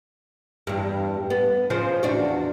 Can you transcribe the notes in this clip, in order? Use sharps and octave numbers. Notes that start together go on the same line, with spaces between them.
E2 G2
B3
C#3 F3 C5
E2 D4 F#4